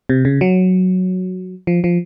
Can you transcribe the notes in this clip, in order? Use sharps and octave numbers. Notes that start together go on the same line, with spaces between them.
C3
C#3
F#3
F3
F3